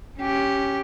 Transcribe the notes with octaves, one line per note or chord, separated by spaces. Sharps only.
C#4 G4